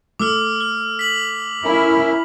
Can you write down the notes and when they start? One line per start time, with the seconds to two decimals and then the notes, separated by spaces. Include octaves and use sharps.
0.19 A3 D6 E6 F6
0.60 F6
0.99 B6 F#7
1.65 C#4 E4 A#4